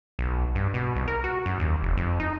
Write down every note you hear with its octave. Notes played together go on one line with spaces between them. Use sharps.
B1
G2
B2
C2
A#4
F#4
F#2
D#2
F1
F2
D#4